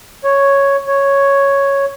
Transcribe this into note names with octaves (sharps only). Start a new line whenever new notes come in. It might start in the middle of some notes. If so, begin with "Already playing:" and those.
C#5
C#5